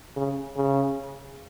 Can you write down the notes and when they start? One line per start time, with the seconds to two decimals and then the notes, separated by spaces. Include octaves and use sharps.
0.16 C#3
0.57 C#3